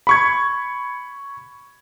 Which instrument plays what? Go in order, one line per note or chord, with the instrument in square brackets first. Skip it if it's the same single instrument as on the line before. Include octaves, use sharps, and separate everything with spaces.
[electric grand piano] B5 C#6 G#6